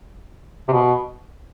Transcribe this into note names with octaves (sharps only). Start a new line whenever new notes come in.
C3
B2